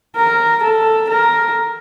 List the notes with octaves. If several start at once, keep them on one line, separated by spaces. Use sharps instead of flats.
A#4
A4
A#4